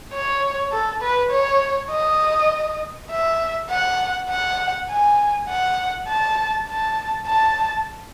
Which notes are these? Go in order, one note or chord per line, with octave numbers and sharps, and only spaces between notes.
C#5
A4
B4
C#5
D#5
E5
F#5
F#5
G#5
F#5
A5
A5
A5